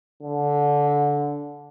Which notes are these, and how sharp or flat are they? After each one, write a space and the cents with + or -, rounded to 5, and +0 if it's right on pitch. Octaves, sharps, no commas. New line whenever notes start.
D3 -15